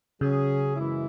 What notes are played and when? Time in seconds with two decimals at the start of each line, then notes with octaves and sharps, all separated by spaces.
0.21 C#3 F#3 C#4 G#4
0.76 F#2 E3 G#3 E4